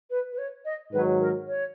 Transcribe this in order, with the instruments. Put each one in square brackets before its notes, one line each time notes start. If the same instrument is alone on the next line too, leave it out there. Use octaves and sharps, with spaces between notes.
[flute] B4
B4
C#5
D#5
[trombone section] G#2 D#3 F#3 [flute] B4
[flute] A#4
C#5